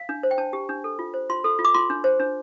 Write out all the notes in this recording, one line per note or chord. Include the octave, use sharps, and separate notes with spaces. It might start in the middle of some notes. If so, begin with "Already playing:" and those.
Already playing: F5
D4
C5
G5
D4 A5
G4
D4
A4
F4
C5
F4 C6
A4
F4
D6
F4 C6
D4
C5
D4